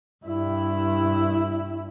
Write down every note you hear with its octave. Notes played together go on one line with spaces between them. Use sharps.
G2 E4